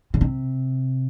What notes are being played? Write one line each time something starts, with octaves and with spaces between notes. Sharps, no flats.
C#3
C3